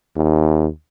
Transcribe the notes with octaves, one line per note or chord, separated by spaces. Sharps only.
D#2